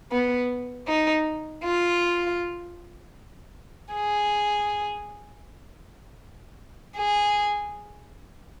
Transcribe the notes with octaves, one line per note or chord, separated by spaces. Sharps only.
B3
D#4
F4
G#4
G#4